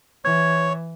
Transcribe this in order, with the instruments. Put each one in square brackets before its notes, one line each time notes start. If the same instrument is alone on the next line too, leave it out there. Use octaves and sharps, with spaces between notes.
[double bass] E3 [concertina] C#5 [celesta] G#6